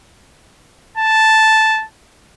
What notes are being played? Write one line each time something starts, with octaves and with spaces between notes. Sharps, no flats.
A5